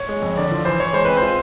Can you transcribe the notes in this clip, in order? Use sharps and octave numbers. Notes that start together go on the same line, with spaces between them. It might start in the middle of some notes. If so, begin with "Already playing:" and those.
Already playing: C#5
G#3
F2
D3 D5
F3
E3 C5
E3 C#5
G#3 C5
C4 B4
F4 C5